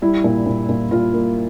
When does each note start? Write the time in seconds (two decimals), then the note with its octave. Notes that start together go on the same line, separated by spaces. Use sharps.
0.02 G3 E4
0.24 A#2
0.46 A#2
0.69 A#2
0.91 A#2 F4
1.14 A#3